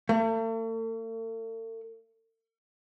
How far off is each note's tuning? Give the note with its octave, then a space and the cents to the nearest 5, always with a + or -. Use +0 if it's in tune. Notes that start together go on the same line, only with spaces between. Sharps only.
A3 +45